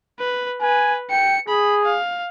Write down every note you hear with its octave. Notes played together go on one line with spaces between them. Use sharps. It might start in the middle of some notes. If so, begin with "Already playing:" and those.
B4
B4 G#5
G5 C#7
G#4 B5
F5